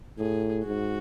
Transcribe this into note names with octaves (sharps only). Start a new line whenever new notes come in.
A2 G#4
G#2 F#4